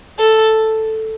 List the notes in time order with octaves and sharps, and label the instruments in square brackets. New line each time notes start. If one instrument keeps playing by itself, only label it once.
[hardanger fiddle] A4